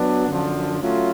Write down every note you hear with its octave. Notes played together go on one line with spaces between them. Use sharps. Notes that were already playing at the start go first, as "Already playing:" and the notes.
Already playing: F#3 B3 D4
F#2 D3 F3
F#3 A3 C#4 F4